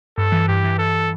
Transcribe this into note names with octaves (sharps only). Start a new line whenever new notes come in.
G2 A4
E3
G2 G4
E3
E3 A4